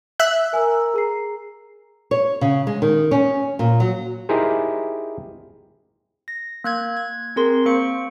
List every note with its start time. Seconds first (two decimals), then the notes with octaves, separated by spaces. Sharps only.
0.19 E5 F#6
0.53 A#4 G#5 E6
0.94 G#4 A#5 C7
2.11 C#5
2.41 C#3
2.67 G#3
2.82 D#3
3.11 C#4
3.59 A#2
3.80 F#3
4.29 D#4 E4 G4 G#4 A#4 C5
6.28 A#6
6.64 A#3 F#6 G#6
6.97 G#6
7.36 C4 G#4 A#4 C6
7.66 A#3 C5 C#6 C#7